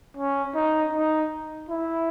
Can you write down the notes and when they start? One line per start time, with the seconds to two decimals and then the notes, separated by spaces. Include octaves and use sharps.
0.17 C#4
0.55 D#4
0.93 D#4
1.69 E4